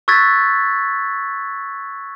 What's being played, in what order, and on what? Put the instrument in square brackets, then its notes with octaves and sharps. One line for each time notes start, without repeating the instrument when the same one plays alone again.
[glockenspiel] C#6 E6 F#6 G#6 A6 B6